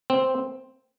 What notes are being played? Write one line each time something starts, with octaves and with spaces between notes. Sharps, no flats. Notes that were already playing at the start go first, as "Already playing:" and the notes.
C4